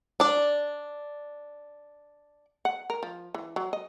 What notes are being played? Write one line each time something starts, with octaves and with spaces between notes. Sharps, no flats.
D4 D5
F#5
A#4
F3
E3
F#3
D#5